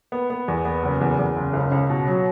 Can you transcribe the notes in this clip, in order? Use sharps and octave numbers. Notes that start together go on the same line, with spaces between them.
B3
B3
E2
B3
F#1
E2
E2
F#1
C#2
C#2
B2
F#3